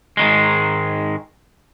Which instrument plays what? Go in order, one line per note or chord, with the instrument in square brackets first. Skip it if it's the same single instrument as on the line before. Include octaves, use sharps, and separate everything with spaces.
[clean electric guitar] G#2 D#3 G#3